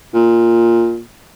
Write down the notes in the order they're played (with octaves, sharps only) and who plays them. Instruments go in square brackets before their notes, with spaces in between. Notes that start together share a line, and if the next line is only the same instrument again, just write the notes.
[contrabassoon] A#2